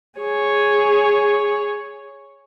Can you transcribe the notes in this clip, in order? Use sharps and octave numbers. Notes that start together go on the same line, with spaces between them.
G#4 C#5